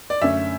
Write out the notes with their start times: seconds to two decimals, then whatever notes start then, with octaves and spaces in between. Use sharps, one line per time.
0.10 D5
0.22 F#2 D3 A3 C#4 E5